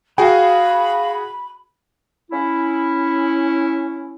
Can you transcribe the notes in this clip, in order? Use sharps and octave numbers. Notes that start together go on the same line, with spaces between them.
F#4 G#4 F5 G5 G#5 B5
C#4 E4